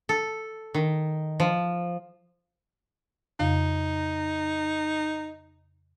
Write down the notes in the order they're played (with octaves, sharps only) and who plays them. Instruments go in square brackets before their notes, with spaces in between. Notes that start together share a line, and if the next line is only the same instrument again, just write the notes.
[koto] A4
D#3
F3
[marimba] F2 C#3 F5 [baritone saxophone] D#4